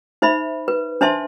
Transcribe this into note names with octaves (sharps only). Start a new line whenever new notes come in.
D#4 C5 E5 B5
B4
D4 C5 E5 A5 C6